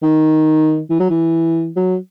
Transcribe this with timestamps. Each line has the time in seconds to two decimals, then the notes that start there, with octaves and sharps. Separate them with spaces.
0.03 D#3
0.90 E3
0.99 F#3
1.10 E3
1.76 F#3